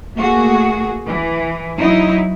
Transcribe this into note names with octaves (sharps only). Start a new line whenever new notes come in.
A3 A#3 F#4 G#4
E3
F#3 D#4 E4